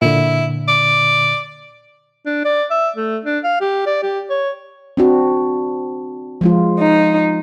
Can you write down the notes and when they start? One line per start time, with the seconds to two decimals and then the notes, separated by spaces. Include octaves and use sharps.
0.02 A#2 D3 E4
0.68 D5
2.26 D4
2.45 D5
2.71 E5
2.96 A3
3.25 D4
3.44 F5
3.61 G4
3.86 D5
4.03 G4
4.30 C#5
4.97 C4 D4 F#4
6.41 F3 G#3 F4
6.79 D#4